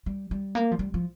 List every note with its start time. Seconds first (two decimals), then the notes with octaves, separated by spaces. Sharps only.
0.06 G3
0.31 G3
0.55 A#3
0.72 F3
0.79 G3
0.94 F3